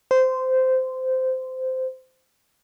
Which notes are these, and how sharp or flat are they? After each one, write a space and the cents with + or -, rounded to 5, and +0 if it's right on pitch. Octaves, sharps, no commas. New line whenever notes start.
C5 -15